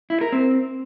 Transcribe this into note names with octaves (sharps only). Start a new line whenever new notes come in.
E4
A#4
C4